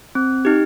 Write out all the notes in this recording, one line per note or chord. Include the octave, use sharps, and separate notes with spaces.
C4
D#4 G4